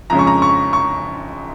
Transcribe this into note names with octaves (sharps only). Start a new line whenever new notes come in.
F2 C#3 G#3 C#4 A#5
C#6
A#5
C#6
C#6